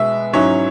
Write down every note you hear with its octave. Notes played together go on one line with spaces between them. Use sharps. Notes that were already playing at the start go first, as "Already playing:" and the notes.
Already playing: B2 G#3 B3 E5
G#2 F#3 C#4 E4 C#5